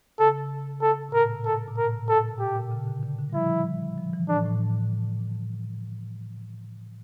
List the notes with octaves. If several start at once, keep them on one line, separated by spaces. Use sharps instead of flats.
C#3 A4
A4
A2
A#2 A#4
A4
A#2
A2 A#4
A#2 A4
A#2
G4
A#2
C#3
D3
D3
D3
G3
F3 E4
F3
E3
A2 D4
A2